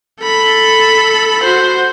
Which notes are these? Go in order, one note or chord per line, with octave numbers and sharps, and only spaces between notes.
A4 B5
F#4 C5